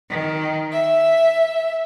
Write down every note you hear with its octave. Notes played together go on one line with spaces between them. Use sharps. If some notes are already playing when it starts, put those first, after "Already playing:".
D#3
E5